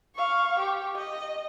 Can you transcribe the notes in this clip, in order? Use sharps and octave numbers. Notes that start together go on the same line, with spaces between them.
F5 C#6
G4
D#5